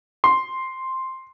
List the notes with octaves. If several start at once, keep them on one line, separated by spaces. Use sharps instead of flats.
C6